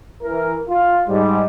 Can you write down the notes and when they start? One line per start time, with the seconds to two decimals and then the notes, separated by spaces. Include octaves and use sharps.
0.23 E3 A#4
0.69 F4
1.08 G#2 G3